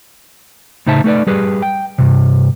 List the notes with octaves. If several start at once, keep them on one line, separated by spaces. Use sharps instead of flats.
A2 C#3 D#4 C5 E5 A5
A3 D#4 B4 D5
G3 G4 G#4 B4
G5
G2 C3